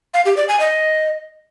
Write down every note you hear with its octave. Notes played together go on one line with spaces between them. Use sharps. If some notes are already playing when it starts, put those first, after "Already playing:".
F5
G4
D5
G#5
D#5